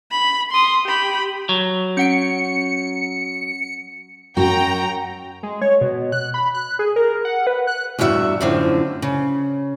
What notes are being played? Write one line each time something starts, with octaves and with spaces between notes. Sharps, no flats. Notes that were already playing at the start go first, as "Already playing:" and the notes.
B5
C6 D#6
G4 B5
F#3
C#4 F#5 C#7 D7
F#2 F#4 G5 A#5
G#3
C#5
B2
F#6
B5
F#6
G#4
A#4
F#5
B4
F#6
E2 G2 G3 F#4 E5
F#2 A2 D3 F3 C4
C#3